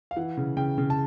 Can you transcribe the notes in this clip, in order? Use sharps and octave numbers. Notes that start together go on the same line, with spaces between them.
F5
E3 F#5
C#3
C#3 G5
C#3
A5